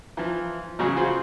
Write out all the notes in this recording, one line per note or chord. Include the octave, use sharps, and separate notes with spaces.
E3 F3
A1 C#3 F#3 G#4
F4 F#4 G#4 C5